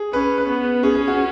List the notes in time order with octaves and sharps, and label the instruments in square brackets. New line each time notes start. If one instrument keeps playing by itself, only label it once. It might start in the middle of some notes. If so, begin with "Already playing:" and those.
Already playing: [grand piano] G#4
[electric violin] C#4 [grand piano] B4
[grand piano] B4
[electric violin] B3
[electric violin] C#4 [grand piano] G#4
[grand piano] G#4
F#4